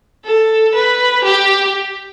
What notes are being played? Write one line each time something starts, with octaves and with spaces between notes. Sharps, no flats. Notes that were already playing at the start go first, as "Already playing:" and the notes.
A4
B4
G4